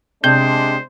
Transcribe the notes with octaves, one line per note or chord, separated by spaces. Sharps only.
C3 G#3 D4 C5 G6